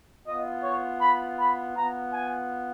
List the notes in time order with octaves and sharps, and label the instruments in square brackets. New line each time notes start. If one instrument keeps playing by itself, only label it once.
[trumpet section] B3 F4 D#5
C#5
B5
B5
B3 F4 A#5
G#5